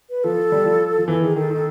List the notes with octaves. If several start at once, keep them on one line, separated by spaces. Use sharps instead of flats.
B4
F3 A4
G3
F3
F3
E3 A4
D#3 G#4
D#3 A4
D#3